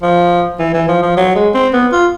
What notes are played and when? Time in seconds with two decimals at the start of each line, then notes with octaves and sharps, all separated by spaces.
0.02 F3
0.59 E3
0.74 E3
0.88 F3
1.02 F3
1.17 F#3
1.35 G#3
1.54 C4
1.73 B3
1.92 F4